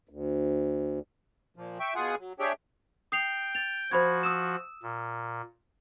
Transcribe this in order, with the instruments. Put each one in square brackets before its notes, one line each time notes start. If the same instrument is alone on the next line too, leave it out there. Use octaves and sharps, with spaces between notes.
[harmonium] D2
[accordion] A#2 F3
E5 G5 C#6
B2 F4 G#4 F#5 G#5
F#3
D4 G4 G#4 C#5 E5 G5
[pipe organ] G5 [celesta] D#6 C7 F7
[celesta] A6 F7
[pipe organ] F3 F#4 [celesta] C5 B5 G#6
[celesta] D#6 E6 E7
[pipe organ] A#2